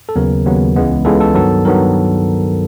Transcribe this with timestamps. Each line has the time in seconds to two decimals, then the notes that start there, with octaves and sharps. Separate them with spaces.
0.09 A4
0.16 D#2 C#3 F#3 B3 A#4
0.46 D#2 C#3 F#3 B3
0.76 C#2 C#3 E3 G#3 B3
1.05 C#2 C#3 E3 G#3 B3 A4
1.20 A4
1.35 G2 D#3 F#3 B3 A4
1.65 G2 D#3 F#3 B3 A#4